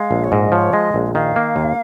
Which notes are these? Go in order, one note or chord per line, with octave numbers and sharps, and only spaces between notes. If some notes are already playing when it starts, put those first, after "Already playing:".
Already playing: G#3 F5
A#1
C#5
G#2 D#5
F3 C#5
G#3 D#5
A#1
D#3 F5
A#3
D#2